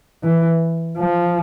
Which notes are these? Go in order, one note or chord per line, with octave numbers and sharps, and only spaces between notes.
E3
F3